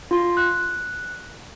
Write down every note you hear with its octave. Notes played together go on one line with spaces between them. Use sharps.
F4 C6
F#6